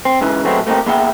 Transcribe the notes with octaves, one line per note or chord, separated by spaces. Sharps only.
C4
G#2 C#3 E3
F#3 G#3 A3 B3 C4 F#4
A3 A#3 C4 D#4 G4
A#3 B3 G#4 E5 F#5 G5